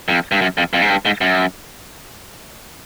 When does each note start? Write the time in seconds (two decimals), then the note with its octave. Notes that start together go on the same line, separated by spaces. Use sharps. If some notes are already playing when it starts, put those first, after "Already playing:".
0.08 F2
0.32 G2
0.41 F#2
0.58 F2
0.73 F2
0.82 G#2
0.90 G2
1.05 G#2
1.21 F#2